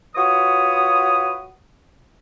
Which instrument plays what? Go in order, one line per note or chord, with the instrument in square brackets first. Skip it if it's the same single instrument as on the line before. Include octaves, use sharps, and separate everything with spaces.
[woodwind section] F4 F#4 B4 C#5 D#6